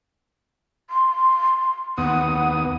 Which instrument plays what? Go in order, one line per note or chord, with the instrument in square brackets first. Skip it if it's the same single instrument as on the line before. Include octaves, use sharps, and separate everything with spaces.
[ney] C6
[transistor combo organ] D#2 B3 D#6 [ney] F#5